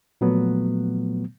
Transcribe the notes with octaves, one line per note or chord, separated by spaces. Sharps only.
A#2 F3 F#3 A3 B3